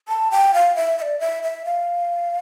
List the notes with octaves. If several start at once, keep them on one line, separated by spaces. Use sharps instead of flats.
A5
G5
F5
E5
E5
D5
E5
E5
F5